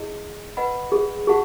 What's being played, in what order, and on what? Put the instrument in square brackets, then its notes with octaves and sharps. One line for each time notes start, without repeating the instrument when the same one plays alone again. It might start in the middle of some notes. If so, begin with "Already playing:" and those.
Already playing: [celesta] E4 G#4 D#5
B4 D#5 F#5 B5
[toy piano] G#4
[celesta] F#4 F#5 A5 C#6 [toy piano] G#4